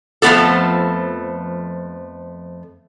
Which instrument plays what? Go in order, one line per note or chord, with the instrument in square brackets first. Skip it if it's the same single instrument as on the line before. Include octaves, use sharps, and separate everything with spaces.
[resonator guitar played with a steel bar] F2 F3 A3 B3 G4 A4